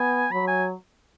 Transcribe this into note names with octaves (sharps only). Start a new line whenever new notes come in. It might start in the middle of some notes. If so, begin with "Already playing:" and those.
Already playing: B3 G#5
F#3 B5
G#5